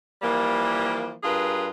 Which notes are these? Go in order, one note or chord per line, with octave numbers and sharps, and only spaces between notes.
E3 F3 G3 A#3
G2 F4 G#4 A#4 B4